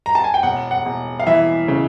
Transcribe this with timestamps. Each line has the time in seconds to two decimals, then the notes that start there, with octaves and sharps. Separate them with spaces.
0.06 A#5
0.15 A5
0.24 G#5
0.34 G5
0.43 E1 F#5
0.71 F#5
0.86 E1
1.20 F5
1.27 E3 E5
1.68 C#3